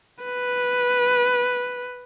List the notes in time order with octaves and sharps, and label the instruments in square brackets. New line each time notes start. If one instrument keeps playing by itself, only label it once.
[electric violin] B4